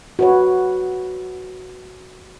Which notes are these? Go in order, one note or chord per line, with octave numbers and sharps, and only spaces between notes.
F#4 B4 C#5